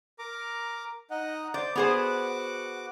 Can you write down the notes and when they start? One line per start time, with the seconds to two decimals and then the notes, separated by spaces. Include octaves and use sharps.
0.19 A#4 A#5 D6
1.11 D#4 D#5 F#5
1.54 C5 D5 G6
1.75 B3 F#4 G#4 C5 F#5 D6